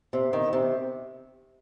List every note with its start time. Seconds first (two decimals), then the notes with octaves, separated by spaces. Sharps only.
0.13 C3
0.33 D#3
0.53 C3